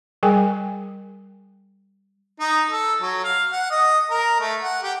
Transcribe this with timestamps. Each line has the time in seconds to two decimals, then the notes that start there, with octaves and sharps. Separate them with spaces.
0.23 G3 G#4 A#4 G5 G#5
2.40 D#4
2.70 A4
3.02 F#3
3.24 F5
3.52 F#5
3.71 D#5
4.10 A#4
4.41 A3
4.62 F#5
4.83 G4